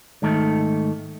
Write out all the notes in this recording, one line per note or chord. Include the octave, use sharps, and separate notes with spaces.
G#2 D#3 A3